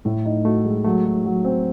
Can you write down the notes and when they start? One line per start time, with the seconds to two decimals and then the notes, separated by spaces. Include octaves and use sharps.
0.05 A2 A3
0.25 D#4
0.45 A3 F#4
0.65 G#3
0.85 F#3 A3
1.05 F#4
1.25 F#3
1.45 C4